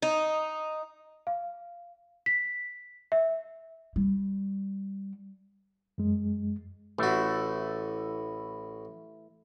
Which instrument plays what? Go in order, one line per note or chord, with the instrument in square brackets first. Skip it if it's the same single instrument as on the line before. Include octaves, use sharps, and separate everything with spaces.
[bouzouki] D#4
[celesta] F5
B6
E5
[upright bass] G3
[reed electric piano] F#2 G#3
[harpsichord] A1 F#4 [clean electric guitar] E3 A3 E4